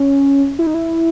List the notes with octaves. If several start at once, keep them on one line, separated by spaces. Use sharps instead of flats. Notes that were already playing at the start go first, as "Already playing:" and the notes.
Already playing: C#4
E4
D#4
E4